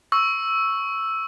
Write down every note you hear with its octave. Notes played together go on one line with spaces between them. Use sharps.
C#6 E6